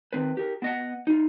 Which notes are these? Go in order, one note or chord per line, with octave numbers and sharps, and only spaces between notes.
D#3 C4 B4
G4 A#4
B3 D#5 F#5
D#4 F4